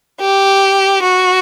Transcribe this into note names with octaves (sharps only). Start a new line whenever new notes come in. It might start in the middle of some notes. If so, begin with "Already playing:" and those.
G4
F#4